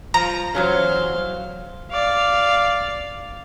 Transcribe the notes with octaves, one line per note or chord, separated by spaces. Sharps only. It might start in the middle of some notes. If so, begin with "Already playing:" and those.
F3 A#5
E2 F#3 C#4 C5 F5
D5 F5